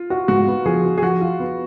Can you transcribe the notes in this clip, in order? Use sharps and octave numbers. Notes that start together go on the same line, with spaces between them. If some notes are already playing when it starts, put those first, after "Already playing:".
Already playing: F4
F#4
G#2 F#4
B3
F3 G#4
F#4
G#4
F3 F#4
F4
B3